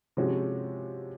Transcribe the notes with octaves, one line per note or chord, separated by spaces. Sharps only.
C3 F3 G#3 C#4 F#4